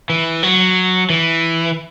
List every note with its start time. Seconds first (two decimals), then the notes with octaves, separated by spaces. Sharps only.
0.10 E3
0.43 F#3
1.10 E3